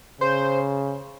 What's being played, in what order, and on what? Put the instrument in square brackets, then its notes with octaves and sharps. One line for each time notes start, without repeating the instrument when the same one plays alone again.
[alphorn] C#3 [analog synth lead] C5